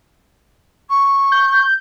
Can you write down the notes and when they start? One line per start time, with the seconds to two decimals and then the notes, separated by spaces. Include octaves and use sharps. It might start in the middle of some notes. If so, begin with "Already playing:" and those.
0.89 C#6
1.32 G6